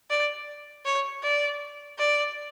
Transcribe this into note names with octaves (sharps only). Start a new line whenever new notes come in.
D5
C#5
D5
D5